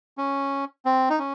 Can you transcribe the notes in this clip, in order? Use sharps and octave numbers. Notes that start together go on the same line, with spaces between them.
C#4
C4
D#4
C#4